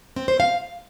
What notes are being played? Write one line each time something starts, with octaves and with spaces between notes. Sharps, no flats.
C4
C5
F5